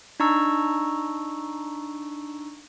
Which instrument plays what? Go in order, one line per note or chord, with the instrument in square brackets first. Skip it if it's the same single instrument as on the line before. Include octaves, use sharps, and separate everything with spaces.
[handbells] D4 D#4 A#5 C#6 E6